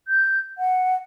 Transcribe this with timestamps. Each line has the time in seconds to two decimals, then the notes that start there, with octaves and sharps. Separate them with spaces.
0.08 G6
0.58 F#5